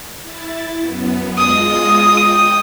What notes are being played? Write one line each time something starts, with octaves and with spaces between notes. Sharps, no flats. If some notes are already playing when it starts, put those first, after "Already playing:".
E4 A6
F#2 B3
G#3 F4 D#5 D#6
G5